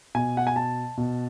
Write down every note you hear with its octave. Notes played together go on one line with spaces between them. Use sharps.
B2 G#5
F#5
G#5
A5
B2